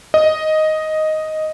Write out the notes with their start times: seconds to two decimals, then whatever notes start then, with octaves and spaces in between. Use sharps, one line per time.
0.14 D#5